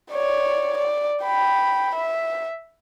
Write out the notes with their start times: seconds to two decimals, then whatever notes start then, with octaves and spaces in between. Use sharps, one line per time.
0.12 C#5 D5
0.78 D5
1.24 G5 B5
1.95 E5